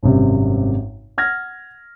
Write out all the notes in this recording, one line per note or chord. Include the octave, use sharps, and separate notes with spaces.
G#1 F#2 C3 G3
F#5 F6 G#6 A#6